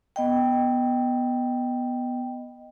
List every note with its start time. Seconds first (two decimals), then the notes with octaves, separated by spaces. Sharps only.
0.16 B3 D#5 G5